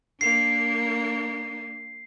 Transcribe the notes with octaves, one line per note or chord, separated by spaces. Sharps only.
A#3 D4 C7